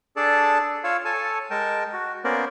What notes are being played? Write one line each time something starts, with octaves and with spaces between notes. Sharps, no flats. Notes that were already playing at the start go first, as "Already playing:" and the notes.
D4 G#4 A4 D5 A5
F4 C#5 F5 E6
A4 C#5 G#5 A5
G#3 A#4 G5 A5
F#4
A#3 B3 C#4 A#4 C5 D5